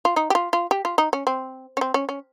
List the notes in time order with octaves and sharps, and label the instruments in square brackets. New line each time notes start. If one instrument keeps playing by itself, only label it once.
[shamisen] F4
D#4
G4
F4
F4
G4
F4
D#4
C#4
C4
C#4
C4
C#4
C#4